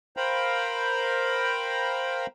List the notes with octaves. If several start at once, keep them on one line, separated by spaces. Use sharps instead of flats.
A#4 C5 F5 G5 A#5 B5